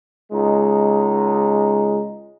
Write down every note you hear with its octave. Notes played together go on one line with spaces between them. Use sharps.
C#2 G#3 D#4